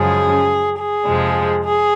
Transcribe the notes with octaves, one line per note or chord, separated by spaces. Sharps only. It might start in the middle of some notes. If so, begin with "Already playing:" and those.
Already playing: F#2 C#3 F3 G#3 G#4
G#4
F2 C3 F3 G#3
G#4